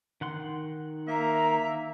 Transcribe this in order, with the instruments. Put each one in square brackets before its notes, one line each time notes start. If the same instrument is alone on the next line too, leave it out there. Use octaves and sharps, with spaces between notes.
[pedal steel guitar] D#3 F#5 C6
[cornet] A#3 [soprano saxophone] E5 [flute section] A#5